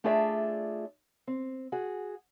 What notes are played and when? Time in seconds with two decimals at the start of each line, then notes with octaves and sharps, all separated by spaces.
0.04 A3 D4 F4 G#4 D5 E5
1.27 C4
1.72 F#4 G#4